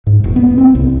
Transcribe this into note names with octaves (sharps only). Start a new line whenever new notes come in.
G#2
E1
B3
C4
C2